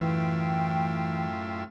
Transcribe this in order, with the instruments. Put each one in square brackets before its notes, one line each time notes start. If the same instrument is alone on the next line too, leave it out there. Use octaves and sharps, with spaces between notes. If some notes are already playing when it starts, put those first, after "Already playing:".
[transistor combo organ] F#2 F4 E5 [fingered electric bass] A2 [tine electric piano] E3 [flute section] G5